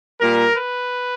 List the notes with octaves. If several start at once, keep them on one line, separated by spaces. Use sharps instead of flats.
A#2 G3 A#4
B4